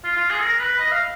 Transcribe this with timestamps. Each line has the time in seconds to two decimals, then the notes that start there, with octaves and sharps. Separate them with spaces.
0.04 F4
0.17 F4
0.30 G#4
0.42 A#4
0.60 B4
0.79 D#5
0.92 F5